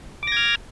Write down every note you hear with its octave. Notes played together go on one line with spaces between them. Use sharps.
D6 F6 G#6 A#6